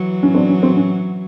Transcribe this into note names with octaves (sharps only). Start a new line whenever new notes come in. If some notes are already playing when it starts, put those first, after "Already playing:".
Already playing: E3 F#3
C#4
C4 D4
C#4
C4
C#4